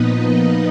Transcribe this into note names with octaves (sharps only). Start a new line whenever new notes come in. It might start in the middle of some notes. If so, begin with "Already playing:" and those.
Already playing: A#2 F3 B3 D#4 B4 D#5